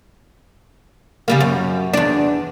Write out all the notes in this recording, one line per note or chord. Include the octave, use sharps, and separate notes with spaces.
C#3 G3 A#3
F#2
E2 D4